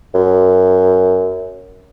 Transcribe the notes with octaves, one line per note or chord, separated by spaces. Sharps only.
F#2